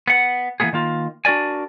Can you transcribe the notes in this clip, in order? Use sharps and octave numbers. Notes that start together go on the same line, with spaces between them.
B3 F#5
E3 F3 A#3 B3 G#4
D#3 A#3 F4
D4 F#4 A#4 D5 G#5